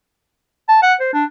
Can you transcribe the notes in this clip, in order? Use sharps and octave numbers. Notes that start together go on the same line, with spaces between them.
A5
F#5
C5
D4